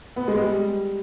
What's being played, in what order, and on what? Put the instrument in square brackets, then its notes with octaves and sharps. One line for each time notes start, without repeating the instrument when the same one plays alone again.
[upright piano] B3
G#3
G3